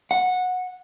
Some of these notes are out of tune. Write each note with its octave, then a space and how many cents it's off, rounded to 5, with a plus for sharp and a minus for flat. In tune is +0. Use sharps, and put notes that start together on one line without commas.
F#5 -15